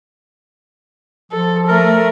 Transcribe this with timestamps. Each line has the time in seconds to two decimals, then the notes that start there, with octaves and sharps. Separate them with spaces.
1.32 F3 A4
1.68 A3 A#4